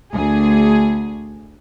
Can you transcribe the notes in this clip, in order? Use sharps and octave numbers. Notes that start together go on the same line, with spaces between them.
D2 G#4